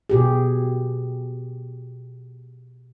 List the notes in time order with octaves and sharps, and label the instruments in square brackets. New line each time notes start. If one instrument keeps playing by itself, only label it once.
[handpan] B2 G4 G#4